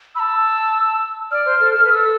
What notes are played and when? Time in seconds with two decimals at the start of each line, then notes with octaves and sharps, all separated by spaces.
0.15 B5 E6
0.20 A5
1.31 D5 F6
1.46 C5
1.60 A4
1.75 A4
1.84 B4
1.90 A4 E6